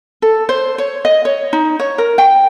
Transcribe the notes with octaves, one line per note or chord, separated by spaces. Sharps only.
A4
C5
C#5
D#5
C#5
D#4
C#5
A#4
G5